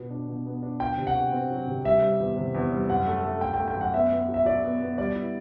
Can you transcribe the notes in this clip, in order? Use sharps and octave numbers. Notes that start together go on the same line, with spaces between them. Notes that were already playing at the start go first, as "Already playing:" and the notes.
Already playing: B2 B3
D4
B2
B3
D4
F#3 G5
C3
F#5
F#4
C4
F#3
C3
G3 E5
G3
E2
C3
E2
G3
F#2 F#5
A3
A3
A3 G5
A3 G5
G5
F#2
F#5
B3 E5
B3
F#3
E5
F#3 D5
B3
B3
G3 D5
E4